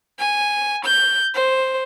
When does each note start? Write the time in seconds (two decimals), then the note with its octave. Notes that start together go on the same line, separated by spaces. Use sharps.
0.20 G#5
0.86 G6
1.35 C5